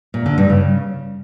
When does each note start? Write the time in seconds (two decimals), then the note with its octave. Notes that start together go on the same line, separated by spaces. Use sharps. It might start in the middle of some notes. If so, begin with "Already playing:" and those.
0.14 A#2
0.26 D3
0.38 G2
0.50 C#3